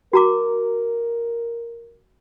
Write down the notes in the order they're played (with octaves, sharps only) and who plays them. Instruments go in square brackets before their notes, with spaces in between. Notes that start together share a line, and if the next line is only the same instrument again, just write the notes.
[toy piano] F#4 A#5 D6 [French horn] A#4